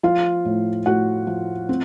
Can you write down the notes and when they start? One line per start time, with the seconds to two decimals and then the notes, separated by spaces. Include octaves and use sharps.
0.03 F3 F4 F5
0.45 A2
0.86 A2 F#4 F#5
1.27 F3
1.69 C4